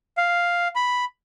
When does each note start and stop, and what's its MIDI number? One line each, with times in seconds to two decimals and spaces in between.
0.18 0.68 77
0.76 1.05 83